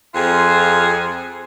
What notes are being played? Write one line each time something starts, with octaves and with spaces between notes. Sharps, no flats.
F2 F4 G#4